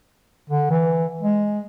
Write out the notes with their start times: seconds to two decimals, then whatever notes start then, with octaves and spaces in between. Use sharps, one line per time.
0.50 D3
0.70 E3
1.21 G#3